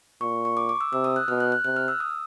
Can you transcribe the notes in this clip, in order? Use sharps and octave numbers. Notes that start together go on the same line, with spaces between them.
A#2 C#6
C#6
D6
D6
E6
C3 E6
D#6
F#6
B2 F6
F#6
F#6
C3 F#6
F6
E6
D#6